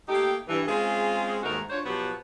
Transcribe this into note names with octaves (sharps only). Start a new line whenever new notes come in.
A3 A#3 D#4 G4
G2 E3
G#3 C4 C#4 F4 G#4
D#2 G#2 A3 D#4 F#4 A#4
D4 F4 F#4 C5 C#5
B2 F3 F#3 B3 F#4 G4